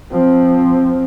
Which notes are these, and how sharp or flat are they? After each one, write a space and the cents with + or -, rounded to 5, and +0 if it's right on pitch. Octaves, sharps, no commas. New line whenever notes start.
F3 +0 C4 +0